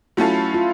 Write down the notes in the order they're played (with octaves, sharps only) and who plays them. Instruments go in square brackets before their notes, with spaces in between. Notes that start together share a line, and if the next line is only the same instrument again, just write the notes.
[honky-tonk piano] F#3 A3 C#4 F4 A4 [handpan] E4
[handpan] F4